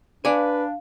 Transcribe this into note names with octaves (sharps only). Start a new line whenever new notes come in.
D4 B4 D5 F5 G#5